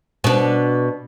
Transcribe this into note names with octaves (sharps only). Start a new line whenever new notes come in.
B2 D4